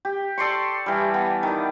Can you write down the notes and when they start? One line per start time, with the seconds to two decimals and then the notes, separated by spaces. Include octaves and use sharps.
0.05 G4
0.38 A4 D5 C6 C#6
0.86 E3 G3
1.14 B3
1.43 D#3 D5